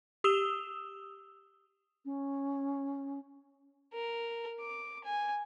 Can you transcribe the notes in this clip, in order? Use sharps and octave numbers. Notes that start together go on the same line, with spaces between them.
G4 D#6 E6 E7 F7 G7
C#4
A#4
D6
G#5